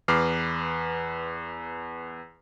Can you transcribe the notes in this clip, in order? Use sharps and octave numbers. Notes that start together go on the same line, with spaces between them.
E2 B4 D6 F6 C7